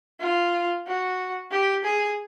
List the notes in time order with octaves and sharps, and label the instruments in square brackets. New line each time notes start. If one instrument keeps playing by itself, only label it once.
[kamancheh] F4
F#4
G4
G#4